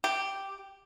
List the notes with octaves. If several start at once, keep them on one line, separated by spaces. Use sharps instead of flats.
G4